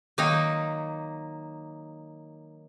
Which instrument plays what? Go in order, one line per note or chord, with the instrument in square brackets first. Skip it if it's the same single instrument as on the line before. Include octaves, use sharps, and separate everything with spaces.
[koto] D#3 F#3 A#3 D#4